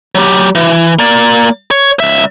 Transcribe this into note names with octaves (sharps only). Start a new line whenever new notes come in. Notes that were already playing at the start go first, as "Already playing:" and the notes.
F#3 G4
E3
A#3 D5
C#5
C#2 E5